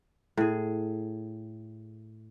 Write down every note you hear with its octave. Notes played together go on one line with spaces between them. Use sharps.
A2 G#4